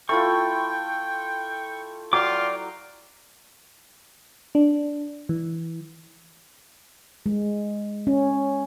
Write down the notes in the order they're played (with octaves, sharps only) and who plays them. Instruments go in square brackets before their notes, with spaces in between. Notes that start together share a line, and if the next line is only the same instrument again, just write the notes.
[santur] A3 E4 F4 [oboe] G5 [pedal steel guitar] C#6
[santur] F#3 [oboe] F4 [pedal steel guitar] D5 G5 D6
[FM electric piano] D4
E3
[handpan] G#3
C#4